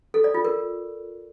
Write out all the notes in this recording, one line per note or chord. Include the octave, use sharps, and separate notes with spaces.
A4
D5
F4
A#4